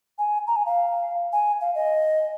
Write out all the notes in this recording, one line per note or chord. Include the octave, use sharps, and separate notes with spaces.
G#5
A#5
G#5
F5
G#5
F5
D#5